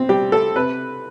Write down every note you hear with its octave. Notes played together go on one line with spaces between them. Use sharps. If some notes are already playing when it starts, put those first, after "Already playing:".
Already playing: B2 C4
G3 G4
A4
C3 B4